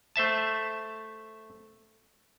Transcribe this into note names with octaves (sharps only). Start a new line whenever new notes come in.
A3 C5 E5 A5